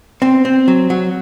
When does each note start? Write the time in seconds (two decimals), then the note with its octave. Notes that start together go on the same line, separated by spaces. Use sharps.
0.22 C4
0.45 C4
0.68 F#3
0.90 F#3